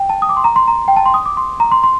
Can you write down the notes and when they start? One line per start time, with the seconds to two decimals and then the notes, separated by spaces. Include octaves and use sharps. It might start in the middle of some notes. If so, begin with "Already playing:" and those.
Already playing: G5
0.09 A5
0.22 D#6
0.29 D6
0.37 C6
0.44 A#5
0.56 C6
0.68 A#5
0.88 G5
0.97 A5
1.06 C6
1.14 D#6
1.26 D6
1.37 C6
1.60 A#5
1.72 C6
1.84 C6